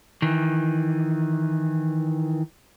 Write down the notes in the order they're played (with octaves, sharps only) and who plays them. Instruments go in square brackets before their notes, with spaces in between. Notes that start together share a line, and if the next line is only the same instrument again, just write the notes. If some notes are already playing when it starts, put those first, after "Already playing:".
[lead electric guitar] D#3 E3